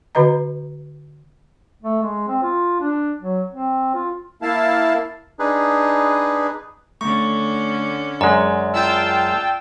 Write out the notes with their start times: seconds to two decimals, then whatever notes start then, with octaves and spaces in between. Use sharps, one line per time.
0.15 D3 F#4 B4 D#5 A#5
1.82 A3
2.02 G#3
2.28 C4
2.42 F4
2.80 D4
3.21 F#3
3.52 C4
3.94 F4
4.42 A#3 E4 F5 A5
5.39 D4 D#4 G#4 B4
7.01 D3 A3 C#4 C#6
8.21 F#2 G#3 D5
8.73 F4 G5 A5 E6